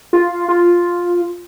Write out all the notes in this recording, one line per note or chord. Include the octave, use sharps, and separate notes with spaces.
F4
F4